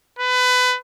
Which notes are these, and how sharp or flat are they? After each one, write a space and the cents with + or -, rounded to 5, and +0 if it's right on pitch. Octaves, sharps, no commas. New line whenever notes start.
B4 +25